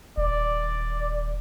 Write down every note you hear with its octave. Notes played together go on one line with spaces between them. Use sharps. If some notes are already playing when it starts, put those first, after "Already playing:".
D#1 D5